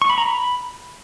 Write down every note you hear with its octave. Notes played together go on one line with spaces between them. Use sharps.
C#6
B5
A#5
B5